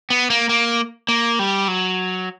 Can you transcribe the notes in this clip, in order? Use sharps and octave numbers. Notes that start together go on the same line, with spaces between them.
B3
A#3
A#3
A#3
G3
F#3